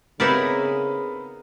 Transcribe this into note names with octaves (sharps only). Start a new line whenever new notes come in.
C#3 B3 C4 D#4 E4 A#4 B4 D5